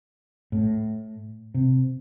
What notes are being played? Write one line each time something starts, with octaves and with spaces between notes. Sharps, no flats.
A2
C3